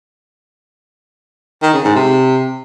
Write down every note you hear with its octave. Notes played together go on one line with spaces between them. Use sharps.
D#3
C#3
G#2
C3